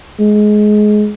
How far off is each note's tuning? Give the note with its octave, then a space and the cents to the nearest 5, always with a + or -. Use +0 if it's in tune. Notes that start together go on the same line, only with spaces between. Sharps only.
G#3 +20